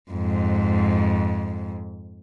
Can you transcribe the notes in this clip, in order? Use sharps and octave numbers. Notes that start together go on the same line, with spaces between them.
F2 G#2